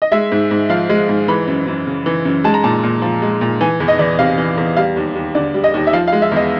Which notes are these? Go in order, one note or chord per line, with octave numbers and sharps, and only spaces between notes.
D#5
G#3 E5
G#2
G#2
F3 F5
G#3
G#2
E3 B5
F#2
F#2
C#3
E3
F#2
G#3 A5
A#5
A#2 A5
A#2
F3
G#3
A#2
E3 G#5
E2
D#5
E2 D5
C3 F5
E3
E2
G3 F5
D#2
D#2
D3 D5
G3
D#5
D#2
E5
F3 F5
F5
G#3
E5
E2 D#5